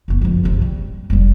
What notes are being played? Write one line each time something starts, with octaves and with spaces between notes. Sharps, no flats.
F#1 B3
F#1 F2
F#1 C3
G3
F1 G3